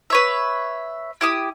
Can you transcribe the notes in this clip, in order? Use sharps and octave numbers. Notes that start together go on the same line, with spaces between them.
B4 C#5 E5
E4 G4 D#6